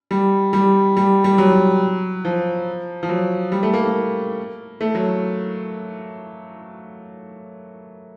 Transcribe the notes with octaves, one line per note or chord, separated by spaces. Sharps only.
G3
G3
G3
G3
F#3
F3
F3
F#3
G3
A3
A#3
A#3
A3
F#3